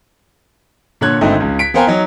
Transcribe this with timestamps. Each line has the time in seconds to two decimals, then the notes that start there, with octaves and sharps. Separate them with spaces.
1.01 A#2 D3 C#5 F#6 G#6
1.21 G#1 D3 A3 C4 D#4
1.40 C#2 C#3
1.59 B6 D7
1.74 B3 A#4 C5 F5 G5 G#5
1.87 F#3 D#4